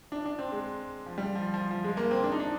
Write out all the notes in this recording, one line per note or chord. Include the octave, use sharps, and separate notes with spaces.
D4
D4
C4
G#3
F3
G3
F3
F3
F3
G#3
A#3
C4
D4
D#4
D4